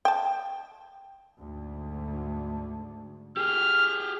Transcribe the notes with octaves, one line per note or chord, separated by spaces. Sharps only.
G5 A5
D2 G#2
G4 G#4 F6